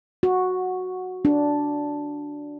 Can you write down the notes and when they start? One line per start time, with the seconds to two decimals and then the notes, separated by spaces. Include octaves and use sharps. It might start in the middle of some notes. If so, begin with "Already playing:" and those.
0.23 F#4
1.25 D4